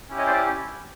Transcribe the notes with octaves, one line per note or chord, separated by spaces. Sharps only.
C#4 E4 G4
C#5 D#5
C5 D5